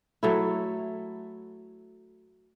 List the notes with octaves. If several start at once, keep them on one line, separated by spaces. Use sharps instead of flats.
F#3 A3 E4